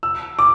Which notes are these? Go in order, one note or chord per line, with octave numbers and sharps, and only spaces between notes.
E6
D6